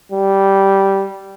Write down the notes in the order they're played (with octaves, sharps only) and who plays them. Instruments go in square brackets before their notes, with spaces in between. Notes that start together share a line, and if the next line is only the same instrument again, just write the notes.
[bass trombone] G3